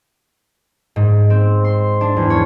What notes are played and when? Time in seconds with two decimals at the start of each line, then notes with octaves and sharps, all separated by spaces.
0.96 G#2
1.30 C4
1.64 C6
2.01 D4
2.17 E2
2.30 C#5